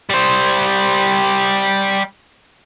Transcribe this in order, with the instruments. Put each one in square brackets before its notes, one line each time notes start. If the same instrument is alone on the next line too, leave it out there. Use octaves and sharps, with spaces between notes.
[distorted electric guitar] G3 C5